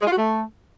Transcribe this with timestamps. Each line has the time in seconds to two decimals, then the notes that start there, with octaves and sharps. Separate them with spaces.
0.01 G#3
0.07 F4
0.12 F#4
0.17 A3